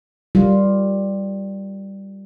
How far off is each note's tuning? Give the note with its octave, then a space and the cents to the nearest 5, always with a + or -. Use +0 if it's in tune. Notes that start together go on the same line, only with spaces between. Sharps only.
G3 +0 F4 +0 A#4 +0